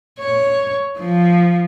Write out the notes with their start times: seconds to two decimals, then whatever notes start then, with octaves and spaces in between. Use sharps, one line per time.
0.20 C#5
0.99 F3